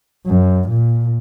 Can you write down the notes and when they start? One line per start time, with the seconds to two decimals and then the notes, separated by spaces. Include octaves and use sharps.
0.26 F#2
0.68 A#2